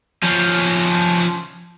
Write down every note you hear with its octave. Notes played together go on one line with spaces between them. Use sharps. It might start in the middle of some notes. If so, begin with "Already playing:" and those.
F3 C#4